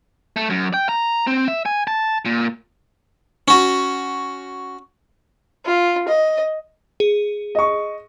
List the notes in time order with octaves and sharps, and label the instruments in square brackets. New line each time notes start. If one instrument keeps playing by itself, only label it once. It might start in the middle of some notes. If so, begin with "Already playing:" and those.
[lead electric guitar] A3
F#2
G5
A#5
C4
E5
G#5
A5
A#2
[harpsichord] C#4 F#4
[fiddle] F4
D#5
[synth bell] G#4
[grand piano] D#5 C#6